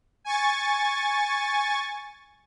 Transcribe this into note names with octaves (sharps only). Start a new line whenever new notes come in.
G#5 C#6 A6